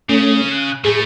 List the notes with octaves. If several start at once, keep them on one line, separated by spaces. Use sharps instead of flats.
C#3 A3 C#4
F#6
A2 A3 G#4